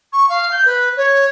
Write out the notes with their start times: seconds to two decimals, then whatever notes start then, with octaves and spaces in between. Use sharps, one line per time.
0.12 C#6
0.29 F5
0.51 G6
0.65 B4
0.96 C#5